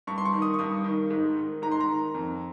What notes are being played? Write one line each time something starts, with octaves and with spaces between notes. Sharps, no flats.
G2 C#6
C6
C#6
D#3
D#6
C#6
G2 D#6
D#3
G#2
D#3
G#2 A#5
C6
A#5
D#3
F2